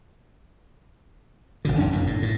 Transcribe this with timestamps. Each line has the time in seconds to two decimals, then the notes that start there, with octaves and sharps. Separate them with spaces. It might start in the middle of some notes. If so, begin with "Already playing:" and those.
1.65 G#1 B2 D3
1.78 A#1 F#2 C#4 D4
1.92 F#1 E2 B2
2.07 A2
2.22 A2